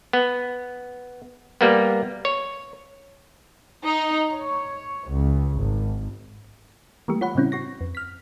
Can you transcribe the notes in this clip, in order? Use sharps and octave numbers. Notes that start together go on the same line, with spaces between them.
B3
G3 A#3 B3
C#5
D#4
C#5
C#2
G#1
E3 G3 A3 A#3 G4
F4 C#5 F#5 B5
A2 C#3 G3 C4 C#4 E4
F#4 C#6 A#6
F2
F6 B6